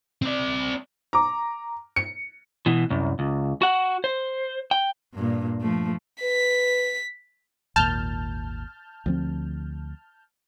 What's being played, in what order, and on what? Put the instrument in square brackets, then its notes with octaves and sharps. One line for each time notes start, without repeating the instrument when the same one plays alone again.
[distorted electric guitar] C4 D5
[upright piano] A#5 D6
C#7
[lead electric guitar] B2 E3
C2 F#2
C#2
F#4 F#5
C5
G5
[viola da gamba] G2 A#2
F3 A3
[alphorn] B4 [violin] B6
[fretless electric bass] G#1 D#2 A#2 [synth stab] A5 F6 G6
[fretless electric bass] D2 F3 C4